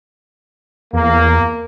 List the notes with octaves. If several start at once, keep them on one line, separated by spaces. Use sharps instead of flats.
E2 A#3